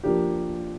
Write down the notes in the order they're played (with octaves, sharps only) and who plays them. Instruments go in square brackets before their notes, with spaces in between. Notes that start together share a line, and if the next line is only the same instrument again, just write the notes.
[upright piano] F3 A#3 D4 G4